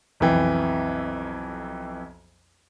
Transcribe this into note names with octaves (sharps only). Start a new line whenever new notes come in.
B1 F2 E3 G5